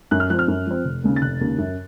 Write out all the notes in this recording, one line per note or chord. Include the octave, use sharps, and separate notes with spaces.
F#2 F#6
F6
F3 C4 F#6
F6
F#2
F3 C4
F1
D#2 C#3
A6
F1 F#6
D#2 C#3
F#2